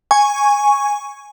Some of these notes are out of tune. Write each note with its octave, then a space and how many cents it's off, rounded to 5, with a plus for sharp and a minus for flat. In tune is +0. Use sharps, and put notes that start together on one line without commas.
G#5 -5 C#6 +0